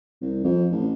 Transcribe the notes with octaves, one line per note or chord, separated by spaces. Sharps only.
C2
F2
A1